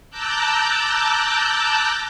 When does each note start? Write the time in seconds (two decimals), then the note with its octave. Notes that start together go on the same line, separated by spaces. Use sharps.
0.10 A5 A#5 D6 E6 F#6 G6